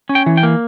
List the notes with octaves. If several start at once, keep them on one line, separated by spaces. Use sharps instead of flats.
C#4
G5
E3
G5
A#3